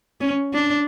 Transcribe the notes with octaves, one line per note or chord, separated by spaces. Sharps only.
C#4
D4